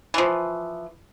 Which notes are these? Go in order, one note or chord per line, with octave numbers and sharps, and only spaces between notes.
E3 F3